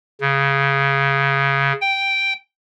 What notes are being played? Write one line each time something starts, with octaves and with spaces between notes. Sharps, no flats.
C#3
G5